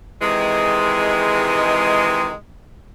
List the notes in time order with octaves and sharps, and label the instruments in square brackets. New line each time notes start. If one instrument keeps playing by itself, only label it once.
[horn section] C3 D#3 E3 G#3